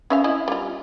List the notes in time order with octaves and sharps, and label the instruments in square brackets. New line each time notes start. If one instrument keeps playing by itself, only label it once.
[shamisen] C#4 E5 F5
E4 D#5
G3 F4